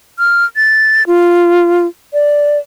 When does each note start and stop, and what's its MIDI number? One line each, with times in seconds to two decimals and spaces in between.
0.19 0.45 89
0.56 1.03 93
1.07 1.86 65
2.14 2.58 74